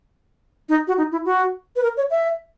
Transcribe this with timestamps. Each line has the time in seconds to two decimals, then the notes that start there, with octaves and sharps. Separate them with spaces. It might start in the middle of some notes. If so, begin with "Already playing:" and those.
0.69 D#4
0.87 F#4
0.98 D#4
1.12 E4
1.25 F#4
1.76 B4
1.83 A#4
1.97 C#5
2.11 E5